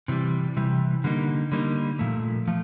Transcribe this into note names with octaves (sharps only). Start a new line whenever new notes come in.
C3 E3 G3
C3 E3 G3
D3 G3 A#3 D#4
D3 G3 A#3 D#4
A#2 F3 A3
F3 A3